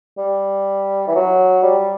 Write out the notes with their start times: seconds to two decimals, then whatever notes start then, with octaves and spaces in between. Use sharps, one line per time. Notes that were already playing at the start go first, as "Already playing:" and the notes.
0.17 G3
1.07 E3
1.15 F#3
1.63 G3